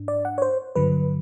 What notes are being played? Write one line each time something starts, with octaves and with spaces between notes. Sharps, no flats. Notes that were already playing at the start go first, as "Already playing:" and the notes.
Already playing: G#2 D4
D5
F#5
C#5
C5
G2 D3 F#3 B4